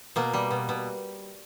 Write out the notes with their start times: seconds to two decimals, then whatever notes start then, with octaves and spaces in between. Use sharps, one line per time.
0.16 B2 A#3
0.33 G3
0.51 B2
0.69 B2